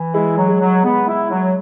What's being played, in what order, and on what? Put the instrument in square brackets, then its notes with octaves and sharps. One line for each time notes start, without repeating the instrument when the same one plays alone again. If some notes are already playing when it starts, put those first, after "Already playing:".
Already playing: [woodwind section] E3
[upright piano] G#3 [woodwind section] E4
[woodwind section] F#3
[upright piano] G#3
[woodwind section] F#3
[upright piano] G#3 [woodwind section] B3
[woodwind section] E4
F#3